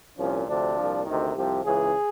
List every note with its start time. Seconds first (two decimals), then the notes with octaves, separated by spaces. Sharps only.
0.17 C2 A#2 F3 C#4
0.47 D2 C3 F3 D4
0.76 C2 A#2 F3
1.06 D2 C3 D#3 D#4
1.34 C2 C3 F3 G4
1.63 C#2 C#3 E3 G#4